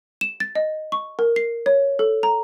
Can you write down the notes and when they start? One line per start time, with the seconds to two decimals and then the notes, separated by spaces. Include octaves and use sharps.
0.21 E7
0.40 A6
0.55 D#5
0.92 C#6
1.19 A#4
1.36 C7
1.66 C#5
1.99 A4
2.23 A#5